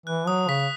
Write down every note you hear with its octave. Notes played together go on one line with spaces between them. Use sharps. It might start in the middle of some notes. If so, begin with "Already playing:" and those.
E3 F#6
F#3 D#6
C#3 B6